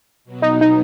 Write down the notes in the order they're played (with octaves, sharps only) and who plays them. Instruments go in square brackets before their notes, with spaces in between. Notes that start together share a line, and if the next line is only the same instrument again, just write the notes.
[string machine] B2 F#3 B3
[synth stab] D#4
D#4